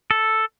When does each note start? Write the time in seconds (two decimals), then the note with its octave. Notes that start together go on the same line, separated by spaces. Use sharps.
0.11 A4